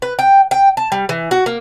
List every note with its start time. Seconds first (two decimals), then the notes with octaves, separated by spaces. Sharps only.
0.02 B4
0.19 G5
0.51 G5
0.77 A5
0.92 G3
1.09 E3
1.31 F#4
1.46 A#3